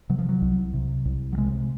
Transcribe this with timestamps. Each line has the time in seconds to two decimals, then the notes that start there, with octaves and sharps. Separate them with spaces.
0.09 C3 F#3
0.19 F3
0.29 F#3
0.42 C2
0.74 C3
1.05 C2
1.33 F#3
1.38 C3 G#3